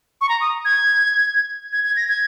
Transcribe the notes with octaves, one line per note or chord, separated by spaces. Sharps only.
C#6
A#5
D#6
G#6
G#6
G#6
A#6
G#6